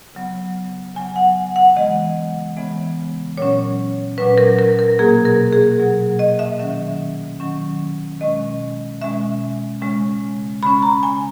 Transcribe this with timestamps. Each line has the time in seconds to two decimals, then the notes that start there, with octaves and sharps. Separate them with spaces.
0.15 C#3 F#3 B3
0.95 C#3 F#3 B3 G#5
1.16 F#5
1.56 F#5
1.76 C#3 E3 G#3 B3 D#5
2.57 C#3 E3 G#3 B3
3.37 A#2 F#3 C#4 C#5
4.18 A#2 F#3 C#4 B4
4.38 A#4
4.59 A#4
4.79 A#4
4.99 B2 F#3 A#3 G#4
5.25 A#4
5.53 G#4
5.79 B2 F#3 A#3
6.19 D#5
6.39 E5
6.60 D#3 F#3 C#4 E5
7.40 D#3 F#3 C#4
8.21 B2 G#3 C#4 D#5
9.02 B2 G#3 C#4 E5
9.81 C#3 G#3 C#4
10.62 C#3 G#3 C#4 B5
10.82 A#5
11.03 G#5